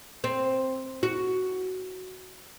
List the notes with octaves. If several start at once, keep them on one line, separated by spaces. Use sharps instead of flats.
C4
F#4